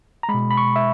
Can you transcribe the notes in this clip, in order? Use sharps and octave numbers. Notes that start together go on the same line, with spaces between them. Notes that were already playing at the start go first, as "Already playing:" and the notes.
A#5
G#3 B5
B2
B5
C#6
E5